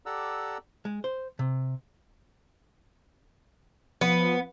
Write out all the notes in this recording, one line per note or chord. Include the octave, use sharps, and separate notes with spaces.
G4 A4 D5 F#5 A#5 E6
G#3
C5
C3
F3 B3